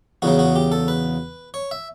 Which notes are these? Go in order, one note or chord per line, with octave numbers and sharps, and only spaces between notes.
E2 C#3 F#3 F#4
F#4
G4
A4
B4
C#5
E5